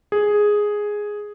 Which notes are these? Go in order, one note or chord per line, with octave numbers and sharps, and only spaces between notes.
G#4